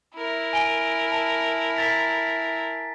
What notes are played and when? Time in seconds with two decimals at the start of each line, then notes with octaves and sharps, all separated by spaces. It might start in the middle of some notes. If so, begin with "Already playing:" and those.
0.15 E4 A#4
0.53 G#5 D7 G7
1.12 A5
1.76 A#5 A6 B6